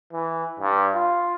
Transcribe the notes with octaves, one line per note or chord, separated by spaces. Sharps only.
E3
G2
F4